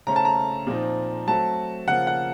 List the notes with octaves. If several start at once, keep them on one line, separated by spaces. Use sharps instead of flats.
C#3 A3 C#4 A4 C5 A#5
A5
A#5
A#2 F3 C4 D#4
F#3 A3 C4 F#4 A5
C#3 F3 A#3 F#5
F#5